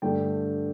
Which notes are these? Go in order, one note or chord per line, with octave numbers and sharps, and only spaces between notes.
G2 D3 A3 D4 G5